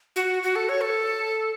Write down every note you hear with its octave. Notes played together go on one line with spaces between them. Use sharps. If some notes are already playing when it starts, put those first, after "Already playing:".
F#4
F#4
A4
C#5
A4